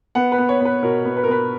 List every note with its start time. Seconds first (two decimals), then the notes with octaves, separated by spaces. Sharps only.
0.15 B3 F#5
0.32 B4
0.38 B3
0.49 C#5
0.60 B3 B4
0.83 B2 A#4
1.05 B3
1.17 B4
1.24 A#4
1.28 B3 B4